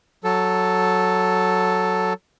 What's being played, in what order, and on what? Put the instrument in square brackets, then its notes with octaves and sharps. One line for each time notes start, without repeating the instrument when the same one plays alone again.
[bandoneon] F#3 A4